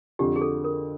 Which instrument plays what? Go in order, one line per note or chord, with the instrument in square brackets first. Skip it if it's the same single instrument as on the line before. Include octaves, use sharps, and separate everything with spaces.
[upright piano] F2 D3 F3 [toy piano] G4
[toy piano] G#4
A4
A#4